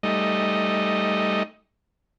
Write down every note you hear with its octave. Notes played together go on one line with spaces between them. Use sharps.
G3 A3 D#4 D#5